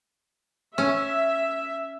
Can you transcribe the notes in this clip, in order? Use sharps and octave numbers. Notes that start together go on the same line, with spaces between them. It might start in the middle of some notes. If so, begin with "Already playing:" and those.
C#4 E5